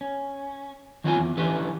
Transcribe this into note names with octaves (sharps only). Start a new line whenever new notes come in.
C#4
D#3 F#3 B3 C4 F4 G#5
E2
D3 E3 C#4 G4 B4